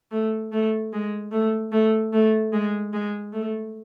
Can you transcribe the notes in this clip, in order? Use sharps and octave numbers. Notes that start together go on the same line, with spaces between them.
A3
A3
G#3
A3
A3
A3
G#3
G#3
A3